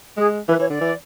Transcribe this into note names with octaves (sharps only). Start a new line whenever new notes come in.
G#3 G#4
E3 B4
E3 C#5
D3 D5
E3